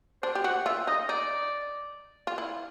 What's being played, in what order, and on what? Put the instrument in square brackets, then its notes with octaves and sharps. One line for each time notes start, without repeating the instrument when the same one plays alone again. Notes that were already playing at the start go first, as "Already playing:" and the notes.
[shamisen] D4 [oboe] C5
[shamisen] G4
[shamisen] F#4 [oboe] F#5
[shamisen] F4 [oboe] E5
[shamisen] D#4 [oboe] D#5
[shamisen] D#4 [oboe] D5
[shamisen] F4
E4